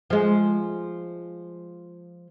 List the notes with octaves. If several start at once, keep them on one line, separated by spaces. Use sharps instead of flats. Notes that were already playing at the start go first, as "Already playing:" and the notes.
F3 G#3